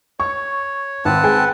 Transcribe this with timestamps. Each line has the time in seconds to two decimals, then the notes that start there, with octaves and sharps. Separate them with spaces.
0.20 C#5 C#6
1.05 G#1 C4 B4 F#5 A5
1.24 G#3 G5 G#5